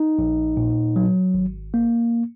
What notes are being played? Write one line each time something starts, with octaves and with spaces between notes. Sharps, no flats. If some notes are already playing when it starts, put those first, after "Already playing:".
Already playing: D#4
A#1
A#2
F#3
G#1
A#3